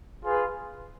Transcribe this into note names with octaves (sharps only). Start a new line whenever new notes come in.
F4 G#4 B4